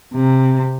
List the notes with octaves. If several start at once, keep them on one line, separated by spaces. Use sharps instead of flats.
C3